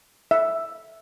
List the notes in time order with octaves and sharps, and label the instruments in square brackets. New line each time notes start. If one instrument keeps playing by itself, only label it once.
[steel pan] E5